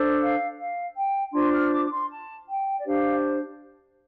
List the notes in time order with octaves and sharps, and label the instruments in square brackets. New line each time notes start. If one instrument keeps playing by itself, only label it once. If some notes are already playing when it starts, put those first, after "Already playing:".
Already playing: [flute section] D4 A4 C5
F5
F5
G5
D4 F4 C5 C6
F6
D6
D6
C6
A5
G5
D5
D4 G4 C5 F5